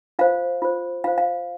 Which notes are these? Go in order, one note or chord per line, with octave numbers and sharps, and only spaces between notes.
F4 C5 F5
F4 C5
F4 C5 F5
F5